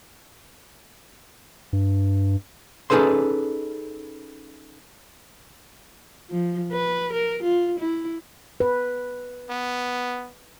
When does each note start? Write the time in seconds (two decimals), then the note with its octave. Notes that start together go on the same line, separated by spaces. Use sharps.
1.73 G2
2.90 C#4 D#4 G#4 A4 B4 C6
6.30 F3
6.72 B4
7.13 A#4
7.43 F4
7.79 E4
8.60 B4
9.50 B3